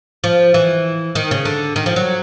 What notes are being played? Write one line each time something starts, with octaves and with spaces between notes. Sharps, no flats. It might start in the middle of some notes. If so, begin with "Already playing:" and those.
F3
E3
D#3
C#3
D3
D#3
F3
F#3